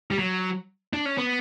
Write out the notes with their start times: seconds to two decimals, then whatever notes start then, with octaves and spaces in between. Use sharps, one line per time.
0.11 G3
0.19 F#3
0.93 D4
1.06 C#4
1.18 B3